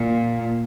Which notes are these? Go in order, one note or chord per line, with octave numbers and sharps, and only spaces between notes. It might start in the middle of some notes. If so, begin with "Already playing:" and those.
Already playing: A#2